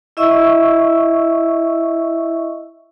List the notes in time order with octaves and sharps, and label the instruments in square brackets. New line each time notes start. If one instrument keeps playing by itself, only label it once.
[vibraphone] E4 D#5 E5 C#6 E6